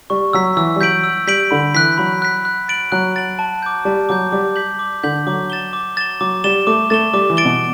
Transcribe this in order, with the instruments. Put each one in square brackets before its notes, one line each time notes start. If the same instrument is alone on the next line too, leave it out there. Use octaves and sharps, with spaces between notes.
[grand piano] G3 [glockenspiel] C#6
[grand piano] F#3 [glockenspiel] E6 B6
[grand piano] E3 [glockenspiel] E6
[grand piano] G3
[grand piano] F#3 [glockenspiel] G6 B6 D7 F#7
[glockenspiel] E6
[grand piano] G3 [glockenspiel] G6 B6 D7 F#7
[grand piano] D3 [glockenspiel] B5
[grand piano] E3 [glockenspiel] F#6 B6
[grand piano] F#3 [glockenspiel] B5
[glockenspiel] F#6 B6
F#6
A6 D7 F#7
[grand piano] F#3 [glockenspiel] F#6
[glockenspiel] A6 D7 F#7
A5
D6 G6
[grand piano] G3 [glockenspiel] A5
[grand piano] F#3 [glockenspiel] D6 G6
[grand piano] G3 [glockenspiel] D6
[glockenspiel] G6 B6 F#7
D6
[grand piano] D3 [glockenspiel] G6 B6 F#7
[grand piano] F#3 [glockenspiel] D6
[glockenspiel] A6 E7 G7
D6
A6 E7 G7
[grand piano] F#3 [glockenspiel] D6
[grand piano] G3 [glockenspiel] A6 E7 G7
[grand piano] A3 [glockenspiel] D6
[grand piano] A3 [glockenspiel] A6 E7 G7
[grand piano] G3 [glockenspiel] D6
[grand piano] E3
[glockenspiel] A6 D7 G7
[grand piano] B2